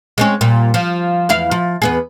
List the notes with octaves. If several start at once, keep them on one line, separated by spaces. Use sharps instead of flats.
G#3 C4 C#4
A#2 G3
F3
E2 E4 F5
F3
E2 B3 G#4